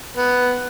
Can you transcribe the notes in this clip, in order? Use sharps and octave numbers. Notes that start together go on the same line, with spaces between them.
B3